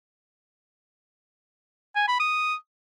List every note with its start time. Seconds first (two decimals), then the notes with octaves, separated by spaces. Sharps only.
1.96 G#5
2.08 B5
2.20 D#6